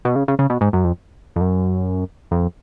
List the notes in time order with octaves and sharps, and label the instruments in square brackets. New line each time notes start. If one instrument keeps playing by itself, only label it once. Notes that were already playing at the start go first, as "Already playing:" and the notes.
[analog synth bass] B2
C#3
C#3
C#3
B2
G#2
F#2
F2
F2
F#2
F2